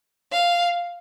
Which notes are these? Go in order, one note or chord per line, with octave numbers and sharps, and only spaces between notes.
F5